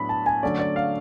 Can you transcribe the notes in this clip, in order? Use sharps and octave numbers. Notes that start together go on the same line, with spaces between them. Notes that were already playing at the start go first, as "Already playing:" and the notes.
Already playing: A2 F#3 B3 D4 B5
A5
G#5
D3 F#3 A3 C#4 D5
D5
F5